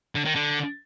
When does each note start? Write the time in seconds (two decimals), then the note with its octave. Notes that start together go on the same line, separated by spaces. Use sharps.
0.15 D3
0.25 D#3
0.35 D3